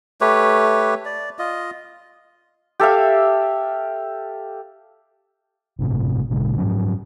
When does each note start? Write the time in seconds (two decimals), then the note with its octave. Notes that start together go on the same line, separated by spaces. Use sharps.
0.21 A3 G4 B4 C#5
1.05 D5
1.39 F4 D#5
2.80 G4 A4 E5 F5
5.79 G1 A2 C3
6.30 G#1 A#2 C#3 G#3
6.58 G#2 F3 F#3 C#4